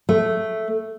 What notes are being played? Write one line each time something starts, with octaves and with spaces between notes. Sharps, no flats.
A3